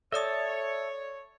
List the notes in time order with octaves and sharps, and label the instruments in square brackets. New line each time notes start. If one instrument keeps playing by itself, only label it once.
[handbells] A4 D5 D#6 [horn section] C#5 [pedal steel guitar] E5 A5